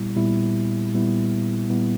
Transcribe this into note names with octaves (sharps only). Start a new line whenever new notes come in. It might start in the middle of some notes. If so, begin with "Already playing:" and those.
Already playing: A#2 G3 B3 E4
A#2 G3 B3 E4
A#2 G3 B3 E4
A#2 G3 B3 E4